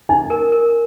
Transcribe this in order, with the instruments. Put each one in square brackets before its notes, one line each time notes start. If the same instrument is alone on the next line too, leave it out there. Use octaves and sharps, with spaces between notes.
[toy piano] D#4 [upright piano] G#5
[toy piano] A#4
A#4